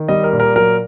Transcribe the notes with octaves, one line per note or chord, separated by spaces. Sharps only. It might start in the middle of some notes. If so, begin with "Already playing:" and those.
Already playing: D#3
G3 D#5
A#4
A#2
A#4
F#3 A#4